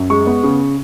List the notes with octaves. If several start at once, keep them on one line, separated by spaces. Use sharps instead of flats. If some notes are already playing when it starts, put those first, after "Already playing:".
Already playing: F#2
G#3 C#6
B3
C#3